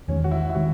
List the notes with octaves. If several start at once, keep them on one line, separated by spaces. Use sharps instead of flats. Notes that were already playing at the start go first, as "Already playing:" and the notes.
E2 D#3 G#3 C#4
F#4
E4
E4
D#3 G#3 F#4